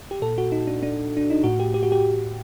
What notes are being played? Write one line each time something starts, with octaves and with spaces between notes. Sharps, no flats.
G4
A#2 A4
F#4
D#4
D4
D4
D4
D#4
A2 F#4
G4
G4
F#4
G4